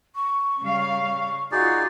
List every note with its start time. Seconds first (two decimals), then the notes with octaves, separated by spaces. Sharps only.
0.15 C#6
0.60 C#3 G3 F5
1.52 D#4 F4 F#4 G#4 D5